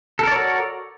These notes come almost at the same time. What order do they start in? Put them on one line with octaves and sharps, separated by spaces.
A4 A#4 D5 C#5 F#4